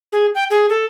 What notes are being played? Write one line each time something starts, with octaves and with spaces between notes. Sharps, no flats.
G#4
G5
G#4
A4